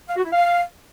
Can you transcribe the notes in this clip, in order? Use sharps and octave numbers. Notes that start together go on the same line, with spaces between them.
F5
F#4
E4
F5